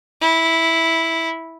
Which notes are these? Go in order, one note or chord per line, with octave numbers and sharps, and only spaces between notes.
E4